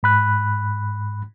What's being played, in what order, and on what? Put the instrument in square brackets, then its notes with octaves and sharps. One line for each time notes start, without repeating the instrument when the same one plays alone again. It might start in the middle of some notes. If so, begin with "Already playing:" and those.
[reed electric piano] G#2 B5 F#6